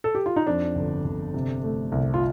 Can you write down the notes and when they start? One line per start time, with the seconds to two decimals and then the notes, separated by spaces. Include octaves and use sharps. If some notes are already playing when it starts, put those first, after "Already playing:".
0.04 A4
0.15 G4
0.26 F4
0.36 D#4
0.47 F2 D4
0.75 G1
1.04 G1
1.34 C3
1.63 A3
1.92 C2
2.14 F4